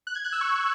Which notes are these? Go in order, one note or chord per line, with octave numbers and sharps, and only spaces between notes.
F#6
G#6
F#6
E6
C#6